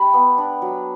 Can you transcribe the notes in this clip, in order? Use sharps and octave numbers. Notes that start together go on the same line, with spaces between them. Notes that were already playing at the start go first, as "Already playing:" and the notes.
Already playing: G3 D4 G5 A5 B5
B3
D4
F#3